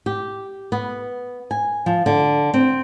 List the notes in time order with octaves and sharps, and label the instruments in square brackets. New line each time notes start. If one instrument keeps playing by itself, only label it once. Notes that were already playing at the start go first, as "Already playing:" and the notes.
[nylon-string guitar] G4
B3
G#5
F3
D3
C4